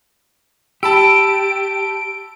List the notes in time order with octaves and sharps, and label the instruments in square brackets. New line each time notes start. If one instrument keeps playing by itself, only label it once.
[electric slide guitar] G4 [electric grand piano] A5 B5 E6 [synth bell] D7